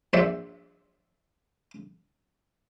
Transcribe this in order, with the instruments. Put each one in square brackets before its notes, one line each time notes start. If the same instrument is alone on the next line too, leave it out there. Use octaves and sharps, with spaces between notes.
[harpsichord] A#1 F#3 C5 D5 E5 C6